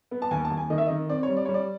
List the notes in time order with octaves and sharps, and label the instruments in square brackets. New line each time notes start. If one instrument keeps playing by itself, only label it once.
[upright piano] B3
A5
D#2 G#5
A5
D#2
G#5
D#3 D#5
E5
D#3 D#5
C4 D5
C#5
G3
D5
G3 C#5
D5